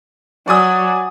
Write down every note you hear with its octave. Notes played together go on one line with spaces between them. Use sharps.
F#3 D5 G#5 D#6